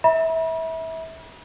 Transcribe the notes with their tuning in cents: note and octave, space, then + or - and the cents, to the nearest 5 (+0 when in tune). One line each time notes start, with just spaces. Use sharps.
E5 -25 B5 -35